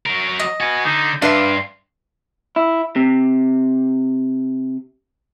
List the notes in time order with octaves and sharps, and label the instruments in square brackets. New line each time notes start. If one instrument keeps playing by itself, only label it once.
[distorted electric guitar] F#3 A#4
[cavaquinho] D#5
[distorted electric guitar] F#4 B4 [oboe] G#5
[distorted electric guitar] D3 [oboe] D#4
[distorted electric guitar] G2 [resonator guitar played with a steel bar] D4 B4 E5 [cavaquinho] F5 [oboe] C6
[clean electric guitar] E4
C3